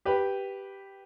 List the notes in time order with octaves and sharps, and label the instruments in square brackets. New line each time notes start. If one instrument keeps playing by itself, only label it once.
[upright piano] G4 B4